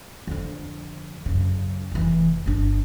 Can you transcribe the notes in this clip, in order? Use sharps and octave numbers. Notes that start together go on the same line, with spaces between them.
F2 D3
F#2 C#3
F1 E3
G1 D4